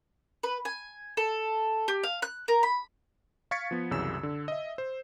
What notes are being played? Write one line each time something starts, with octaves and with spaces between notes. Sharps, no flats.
B4
G#5
A4
G4
F5
F#6
A#4
B5
F5 C#6 G#6 A6 B6 C#7
F3 B3
C2 F#2 C#3 E3 E6 E7
D3
D#5 E5
C5